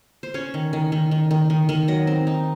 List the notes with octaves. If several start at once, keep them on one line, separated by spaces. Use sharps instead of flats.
C5
C#4 C#5
D#3
D#3
D#3
D#3
D#3
D#3
D#3
F#3 D#5
C4
D#4